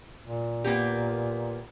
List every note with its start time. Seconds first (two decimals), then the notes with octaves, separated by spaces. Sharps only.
0.25 A#2
0.64 A#3 B3 G4